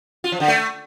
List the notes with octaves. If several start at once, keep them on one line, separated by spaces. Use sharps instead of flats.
F4
F3
D3
A3